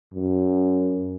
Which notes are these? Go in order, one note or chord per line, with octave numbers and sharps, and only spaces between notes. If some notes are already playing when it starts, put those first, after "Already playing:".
F#2